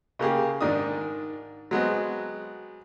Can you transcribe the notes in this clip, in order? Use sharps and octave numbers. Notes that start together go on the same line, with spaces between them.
C#3 A#3 G4 G#4
G#2 D#3 D4 D#6
F#3 G#3 B3 C4